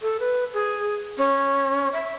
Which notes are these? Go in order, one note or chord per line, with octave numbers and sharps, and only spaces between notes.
A4
B4
G#4
C#4
E5